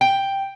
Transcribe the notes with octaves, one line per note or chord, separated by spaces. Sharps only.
G5